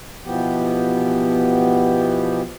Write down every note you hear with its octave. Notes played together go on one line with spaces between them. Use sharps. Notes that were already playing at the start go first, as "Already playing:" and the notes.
B2 E3 F3 B3 G4